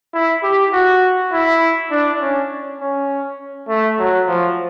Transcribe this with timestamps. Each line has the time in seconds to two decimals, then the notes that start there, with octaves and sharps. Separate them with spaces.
0.14 E4
0.43 G4
0.73 F#4
1.32 E4
1.91 D4
2.21 C#4
2.80 C#4
3.69 A3
3.99 F#3
4.28 F3